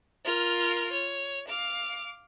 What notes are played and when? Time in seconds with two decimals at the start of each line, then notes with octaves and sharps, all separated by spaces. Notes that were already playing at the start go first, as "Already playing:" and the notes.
0.25 F4 A#4
0.93 C#5
1.49 F5 D6